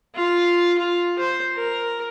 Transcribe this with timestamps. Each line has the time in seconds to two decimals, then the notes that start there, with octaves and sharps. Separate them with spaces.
0.15 F4
0.78 F4
1.19 C5
1.56 A#4